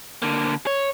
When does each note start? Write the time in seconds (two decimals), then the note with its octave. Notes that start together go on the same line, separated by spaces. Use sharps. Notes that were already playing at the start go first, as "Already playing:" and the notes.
0.22 D3 A#3
0.67 C#5